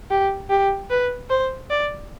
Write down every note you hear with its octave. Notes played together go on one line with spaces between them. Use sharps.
G4
G4
B4
C5
D5